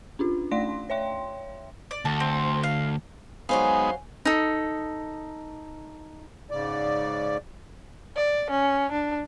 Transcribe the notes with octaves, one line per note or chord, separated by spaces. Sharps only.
C#4 D4 F4
A3 D5 F5 C6 A#6
C#5 E5 G5 C6
D5
D2 A5
C4
F5
F#3 G#3 B3 D#4 C5 F5 G#5
D#4 A4
G#2 C#3 D5
D5
C#4
D4